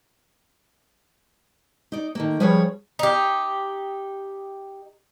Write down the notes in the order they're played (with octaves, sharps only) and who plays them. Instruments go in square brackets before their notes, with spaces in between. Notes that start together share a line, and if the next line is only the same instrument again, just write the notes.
[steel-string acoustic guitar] D#4 D5
D#3 A3 A#3
F3 G3 C#4 G#4 B4 C#5
[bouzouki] D#4 G4